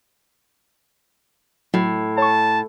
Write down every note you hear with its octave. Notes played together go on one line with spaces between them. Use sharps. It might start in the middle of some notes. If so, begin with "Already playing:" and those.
A2 F#3
C#5 A5 C#6